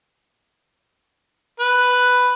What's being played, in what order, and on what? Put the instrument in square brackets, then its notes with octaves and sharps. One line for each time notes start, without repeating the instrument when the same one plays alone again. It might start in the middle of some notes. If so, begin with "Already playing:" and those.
[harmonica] B4